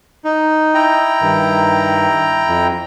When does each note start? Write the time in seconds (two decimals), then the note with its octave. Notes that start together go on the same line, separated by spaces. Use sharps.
0.24 D#4
0.74 E4 G5 A#5
1.21 G2 D#3
2.48 F2